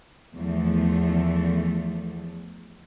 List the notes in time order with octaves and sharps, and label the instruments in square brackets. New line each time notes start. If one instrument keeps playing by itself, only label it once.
[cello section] E2 F3 A3